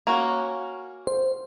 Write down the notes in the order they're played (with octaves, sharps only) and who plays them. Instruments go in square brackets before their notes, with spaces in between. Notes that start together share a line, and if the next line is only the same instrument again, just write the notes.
[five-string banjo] A#3 C#4 F#4
[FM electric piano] C5